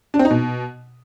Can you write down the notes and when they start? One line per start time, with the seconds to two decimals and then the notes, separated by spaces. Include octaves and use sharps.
0.14 D4
0.19 C4
0.25 D#4
0.30 B2